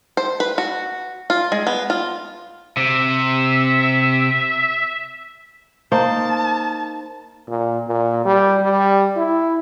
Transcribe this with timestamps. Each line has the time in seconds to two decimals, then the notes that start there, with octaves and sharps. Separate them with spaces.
0.17 C5
0.40 B4
0.58 F#4
1.30 F4
1.52 G#3
1.67 B3
1.90 F4
2.77 C3 E5
5.92 A#3 D#4 C5 A5
7.48 A#2
7.87 A#2
8.25 G3
8.61 G3
9.16 E4